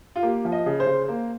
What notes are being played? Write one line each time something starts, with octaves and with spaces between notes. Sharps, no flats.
F4
A#3 G4
F3
D#5
C#3
C5
C#3
A#3